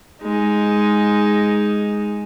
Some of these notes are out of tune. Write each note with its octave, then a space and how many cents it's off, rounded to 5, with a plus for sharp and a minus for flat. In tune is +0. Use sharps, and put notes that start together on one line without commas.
G#3 +0 D#4 +10